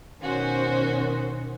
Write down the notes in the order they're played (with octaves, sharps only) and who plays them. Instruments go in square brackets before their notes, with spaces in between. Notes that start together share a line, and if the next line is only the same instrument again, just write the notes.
[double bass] B2 D#3 [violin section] C#4 F#4 C5